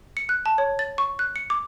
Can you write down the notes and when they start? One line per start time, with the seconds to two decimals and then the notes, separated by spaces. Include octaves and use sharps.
0.17 C#7
0.29 F#6
0.46 A5
0.58 C#5
0.79 A6
0.98 C#6
1.19 F#6
1.36 C#7
1.50 D6